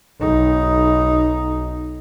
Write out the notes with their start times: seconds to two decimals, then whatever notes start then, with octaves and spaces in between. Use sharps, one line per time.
0.21 B1 D#4